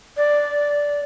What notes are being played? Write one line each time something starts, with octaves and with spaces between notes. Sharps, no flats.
D5